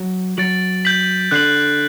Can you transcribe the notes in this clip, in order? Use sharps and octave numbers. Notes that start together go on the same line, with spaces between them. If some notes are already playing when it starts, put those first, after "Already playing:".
Already playing: F#3
F#3 A6 D7 F#7
G6 B6 F#7
D3 F#6 C7 F#7